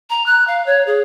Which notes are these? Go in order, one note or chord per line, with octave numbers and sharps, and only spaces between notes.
A#5
F#6
F5
C#5
G#4